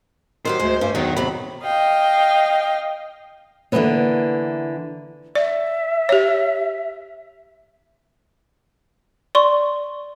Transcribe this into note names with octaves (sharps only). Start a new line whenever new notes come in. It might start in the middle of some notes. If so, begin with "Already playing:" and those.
D#3 F#3 G4 C5
D2 G#3
G2 C#4
E2 D#3 F#3
C3 F#3 B5
D#5 F5 G5
D3 E3 G#3 A#3 B3 C#4
D5 E5
G4 C#5
D5 C6 C#6